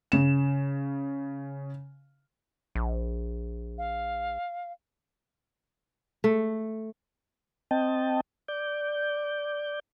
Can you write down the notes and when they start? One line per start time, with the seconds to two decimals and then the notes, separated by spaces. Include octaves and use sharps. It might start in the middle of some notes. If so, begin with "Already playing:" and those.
0.12 C#3 E7
2.75 A#1
3.78 F5
6.24 A3
7.71 C4 D#5 G5 A5
8.48 D5 G6